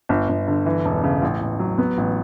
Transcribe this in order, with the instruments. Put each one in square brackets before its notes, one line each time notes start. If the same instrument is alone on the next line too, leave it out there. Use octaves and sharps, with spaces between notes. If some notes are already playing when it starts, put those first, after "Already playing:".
[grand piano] G1
G1
D3
E3
E1
C#3
A1
A1
F#3
B3
A1